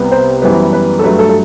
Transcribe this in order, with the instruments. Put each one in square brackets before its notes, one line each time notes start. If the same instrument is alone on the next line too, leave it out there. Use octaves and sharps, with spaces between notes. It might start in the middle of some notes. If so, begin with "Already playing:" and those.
Already playing: [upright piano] C2 C3 G3 B3
C5
F#2 E3 G3 B3 C5
B4
A4
G2 F#3 A3 B4
A4
A4